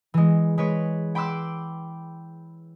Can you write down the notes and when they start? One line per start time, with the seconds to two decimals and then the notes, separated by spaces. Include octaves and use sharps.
0.14 E3 G#3
0.58 G#3 B4 C#5
1.15 G5 B5 C6 D6 E6 F#6